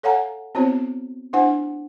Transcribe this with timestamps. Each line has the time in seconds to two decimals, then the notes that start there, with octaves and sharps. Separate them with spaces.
0.03 A4 C#5 F5 F#5 G#5 A#5
0.55 B3 C4 E4 F#4 C5 C#5
1.33 D4 E4 C5 F#5 G#5